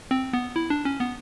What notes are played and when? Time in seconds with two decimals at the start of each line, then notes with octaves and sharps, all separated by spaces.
0.11 C4
0.33 B3
0.56 E4
0.70 D4
0.85 C#4
1.00 B3